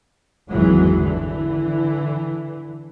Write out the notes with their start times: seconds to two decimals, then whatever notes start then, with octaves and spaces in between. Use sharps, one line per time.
0.51 G#1 E2 E3 F#3 G#3
1.02 D3 E3